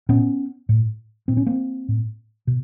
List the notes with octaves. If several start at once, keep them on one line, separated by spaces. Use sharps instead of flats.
A#2 B3 C#4
A2
A#2 C4
C#4
A#3 C4
A2
B2